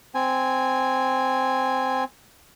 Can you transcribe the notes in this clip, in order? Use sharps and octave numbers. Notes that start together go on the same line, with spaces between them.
C4 G#5